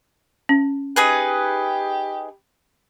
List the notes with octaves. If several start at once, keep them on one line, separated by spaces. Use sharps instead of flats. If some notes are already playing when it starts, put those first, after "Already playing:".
C#4
D#4 G4 G#4 B4